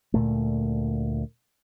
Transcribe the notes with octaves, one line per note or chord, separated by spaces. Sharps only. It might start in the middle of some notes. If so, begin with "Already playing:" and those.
D2 A#2 A3